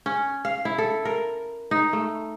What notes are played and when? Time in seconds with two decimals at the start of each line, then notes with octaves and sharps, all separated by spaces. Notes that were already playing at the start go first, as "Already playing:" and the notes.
0.06 C#4
0.45 F5
0.65 E4
0.78 A4
1.05 A#4
1.71 D#4
1.93 A3